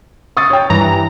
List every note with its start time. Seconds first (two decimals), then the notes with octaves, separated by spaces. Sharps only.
0.37 C#6 D#6 A6
0.50 C#5 G5
0.70 G2 E3 A#5